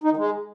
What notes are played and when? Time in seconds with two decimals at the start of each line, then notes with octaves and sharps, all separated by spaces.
0.04 D#4
0.10 D#3
0.17 G#3